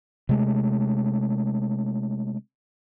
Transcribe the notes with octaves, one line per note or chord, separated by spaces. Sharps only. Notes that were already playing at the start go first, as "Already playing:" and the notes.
C3 G#3 A3